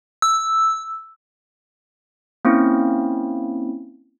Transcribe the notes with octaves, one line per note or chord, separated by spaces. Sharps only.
E6
A#3 C4 C#4 E4